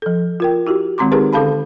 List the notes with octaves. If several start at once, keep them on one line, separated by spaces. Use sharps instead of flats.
F3 A4
F4 A#4 G5
E4 F#4 G4
D#3 G#3 C4 A#5 C6 D6
D#4 G4 G#4 A#4 B4 A5
D3 C#4 A4 F5 A5 B5